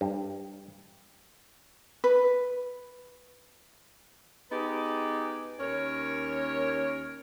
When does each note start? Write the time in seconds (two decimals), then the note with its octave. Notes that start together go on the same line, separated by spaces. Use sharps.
0.01 G2
2.04 B4
4.51 B3 D#4 G4 G#4 B4
5.60 D#2 C#4 A#4 C#5